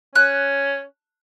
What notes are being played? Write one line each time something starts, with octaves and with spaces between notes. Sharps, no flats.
C#4 F#6